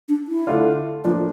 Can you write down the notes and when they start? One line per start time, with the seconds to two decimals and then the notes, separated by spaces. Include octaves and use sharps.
0.09 D4
0.28 E4
0.47 D3 A3 D4 F4
1.04 A2 F3 A#3 D4 F4